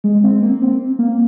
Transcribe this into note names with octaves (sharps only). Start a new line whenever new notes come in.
G#3
C4
A#3
C4
A#3